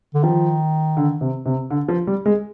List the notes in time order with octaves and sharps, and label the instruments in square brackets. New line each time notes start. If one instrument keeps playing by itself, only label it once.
[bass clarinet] D3
[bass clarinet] D#3 [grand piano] F3
[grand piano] D3
C3
C3
D3
F3
G3
G#3